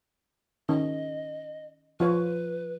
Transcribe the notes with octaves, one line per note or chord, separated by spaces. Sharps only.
D#3 C#4 D#5
F3 F4 B4 C#5